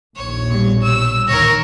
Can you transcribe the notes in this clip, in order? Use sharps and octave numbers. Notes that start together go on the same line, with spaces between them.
A#1 D#2 C#5
B2 G3
E6
D2 A2 D#3 A#4 C#5 A#6